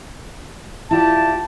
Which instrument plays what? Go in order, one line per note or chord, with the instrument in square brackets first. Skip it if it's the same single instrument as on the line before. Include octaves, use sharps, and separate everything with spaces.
[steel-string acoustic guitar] E4 F4 D5 [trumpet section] G4 A5